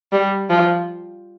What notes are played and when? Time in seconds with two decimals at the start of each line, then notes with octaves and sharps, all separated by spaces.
0.12 G3
0.50 F3